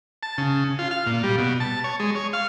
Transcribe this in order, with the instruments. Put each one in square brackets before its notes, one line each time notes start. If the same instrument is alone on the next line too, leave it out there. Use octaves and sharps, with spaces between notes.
[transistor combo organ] A5
C#3
F4
F5
A#2
G3
B2
A5
C#5
G#3
C#5
F5